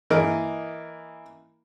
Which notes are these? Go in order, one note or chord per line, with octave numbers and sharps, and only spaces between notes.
E3 A#3 A#4 D#5